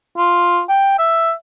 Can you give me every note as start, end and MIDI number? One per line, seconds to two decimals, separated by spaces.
0.17 0.61 65
0.69 0.98 79
0.99 1.32 76